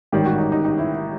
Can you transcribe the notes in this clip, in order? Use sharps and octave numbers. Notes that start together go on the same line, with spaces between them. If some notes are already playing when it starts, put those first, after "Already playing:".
A1 G#2 D#3 G3 G4
F#4
D#4
D#4
D#4
E4